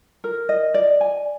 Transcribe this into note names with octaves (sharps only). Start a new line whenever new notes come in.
A#4
D#5
D5
G#5